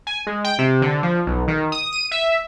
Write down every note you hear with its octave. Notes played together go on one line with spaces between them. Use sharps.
G#5
G#3
G5
C3
D3
F3
B1
D#3
D#6
D#7
E5